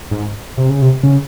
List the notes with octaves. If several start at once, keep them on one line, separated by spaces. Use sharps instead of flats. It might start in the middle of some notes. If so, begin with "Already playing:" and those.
G#2
C3
C#3
C3
C#3